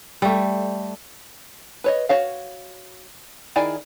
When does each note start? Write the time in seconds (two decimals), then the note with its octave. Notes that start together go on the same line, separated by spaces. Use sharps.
0.22 G3 A3
1.84 B4 C#5 D#5
2.09 F#4 C#5 F5
3.56 D#3 E4 G#4 D5 G#5